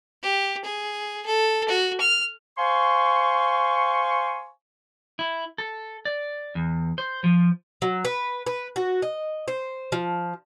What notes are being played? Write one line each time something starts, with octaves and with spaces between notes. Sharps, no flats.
G4
G#4
A4
F#4
F6
C5 F5 G#5 C6 C#6
E4
A4
D5
E2
C5
F3
F#3
B4
B4
F#4
D#5
C5
F3